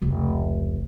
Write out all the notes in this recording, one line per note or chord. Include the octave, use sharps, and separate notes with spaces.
F1 C#2